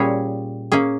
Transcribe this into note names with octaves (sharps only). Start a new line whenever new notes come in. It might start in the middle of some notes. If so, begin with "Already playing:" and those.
Already playing: A#2 G3 C#4 G#4 C#5
A#3 C#4 G#4